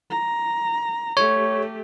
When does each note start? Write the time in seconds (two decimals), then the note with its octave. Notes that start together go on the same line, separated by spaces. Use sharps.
0.10 A#5
1.17 A3 G4 C#5